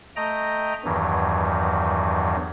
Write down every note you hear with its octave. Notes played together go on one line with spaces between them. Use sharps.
A3 D#5 G5 A#5 A#6
E2 G2 D#3 E3 F#3